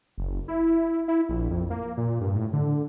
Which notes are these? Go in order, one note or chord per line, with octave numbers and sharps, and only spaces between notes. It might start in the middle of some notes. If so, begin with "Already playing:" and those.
F#1
E4
E4
A#1
F2
A#3
A#2
G2
A2
D3